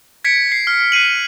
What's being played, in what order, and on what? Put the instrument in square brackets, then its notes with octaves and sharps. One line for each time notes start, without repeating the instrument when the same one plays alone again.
[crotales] G#6 B6 C#7 D7
C7
F6
F#6 C7 D#7 F#7